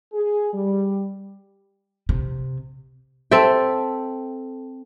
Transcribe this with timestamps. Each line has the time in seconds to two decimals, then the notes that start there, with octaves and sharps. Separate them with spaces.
0.13 G#4
0.53 G3
2.09 C3
3.31 C4 A4 E5 G5